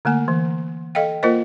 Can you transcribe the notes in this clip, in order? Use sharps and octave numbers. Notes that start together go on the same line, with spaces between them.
D3 A3 A#3 G#5
E3
A4 D#5 F5 G5
A#3 F4 A#4 C5 D#5